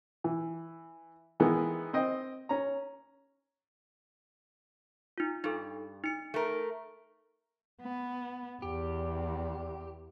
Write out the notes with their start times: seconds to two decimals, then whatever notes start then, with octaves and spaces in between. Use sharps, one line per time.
0.24 E3
1.40 D#3 E3 G#3 B3 D#4
1.93 C4 D#5 G5
2.49 C#4 A#5
5.18 D#4 F4
5.44 G2 D#4 A4
6.04 D#4 C#7
6.34 A3 A#4
7.81 B3
8.62 E2 G4